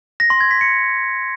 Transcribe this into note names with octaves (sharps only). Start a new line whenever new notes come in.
A#6
C6
G#6
B6
C#7